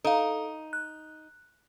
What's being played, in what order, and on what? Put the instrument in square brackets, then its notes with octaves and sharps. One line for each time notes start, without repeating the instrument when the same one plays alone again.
[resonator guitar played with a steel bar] D#4 [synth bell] A4 F5
[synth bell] F#6